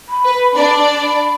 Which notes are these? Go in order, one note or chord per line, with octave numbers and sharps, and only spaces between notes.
B5
B4
D4 D5 B5